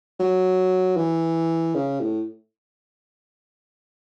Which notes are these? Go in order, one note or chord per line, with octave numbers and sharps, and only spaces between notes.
F#3
E3
C#3
A2